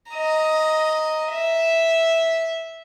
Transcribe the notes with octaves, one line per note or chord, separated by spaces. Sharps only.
D#5 A#5
E5